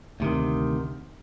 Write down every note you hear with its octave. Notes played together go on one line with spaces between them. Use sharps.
D2 C3 D#3